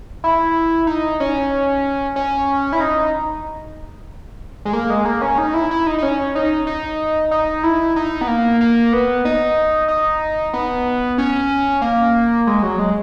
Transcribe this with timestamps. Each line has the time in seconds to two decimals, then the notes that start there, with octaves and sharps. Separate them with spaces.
0.24 E4
0.87 D#4
1.20 C#4
2.16 C#4
2.73 E4
2.80 D#4
4.65 G#3
4.73 A#3
4.90 G#3
5.05 A#3
5.22 C#4
5.38 D#4
5.54 E4
5.71 E4
5.87 D#4
5.98 D#4
6.03 C#4
6.35 D#4
6.67 D#4
7.31 D#4
7.63 E4
7.96 D#4
8.21 B3
8.28 A#3
8.61 A#3
8.93 B3
9.25 D#4
9.88 D#4
10.53 B3
11.18 C#4
11.82 A#3
12.47 G#3
12.63 F#3
12.79 G#3